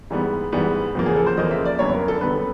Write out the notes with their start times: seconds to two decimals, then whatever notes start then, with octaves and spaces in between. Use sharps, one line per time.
0.10 G#2 E3 G3 B3
0.52 G#2 E3 G3 B3
0.95 E2 C#3 F3 A#3
1.06 G#4
1.16 A4
1.26 C5
1.37 E2 C#3 F3 A#3 D#5
1.51 E5
1.66 D5
1.79 F#2 D3 G3 B3 C#5
1.93 A#4
2.08 A4
2.21 F#2 D3 G3 B3 B4